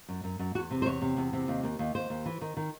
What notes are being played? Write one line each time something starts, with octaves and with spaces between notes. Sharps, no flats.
F#2
F#2
F#2
E2 F#4
C3
C5
E2 C#5
C3
E2
C3
D#2
D#2
D#2
D#2 C5
D#2
E3
D#3
D#3